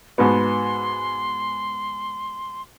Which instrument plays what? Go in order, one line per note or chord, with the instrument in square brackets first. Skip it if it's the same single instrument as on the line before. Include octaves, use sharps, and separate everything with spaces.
[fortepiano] G#2 B2 B3 [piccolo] C6